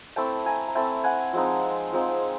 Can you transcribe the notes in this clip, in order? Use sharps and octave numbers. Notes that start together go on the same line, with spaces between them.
A3 C4 E4 G5 A5
G#5 A#5
A#5
A3 C4 E4 G5 A5
F#5 G#5
F3 G#3 C4 D#4
F3 G#3 C4 D#4